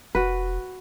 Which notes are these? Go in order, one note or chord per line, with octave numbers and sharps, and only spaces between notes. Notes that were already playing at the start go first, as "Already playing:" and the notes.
F1 F#4 B4